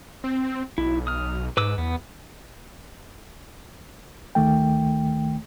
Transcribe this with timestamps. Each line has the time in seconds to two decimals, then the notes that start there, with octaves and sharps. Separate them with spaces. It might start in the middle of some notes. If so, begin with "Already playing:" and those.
0.24 C4
0.78 B1 E4
1.07 D#6 F6
1.57 G#2 B4 D6 E6
1.78 E2 B3
4.35 D2 D#3 A3 G5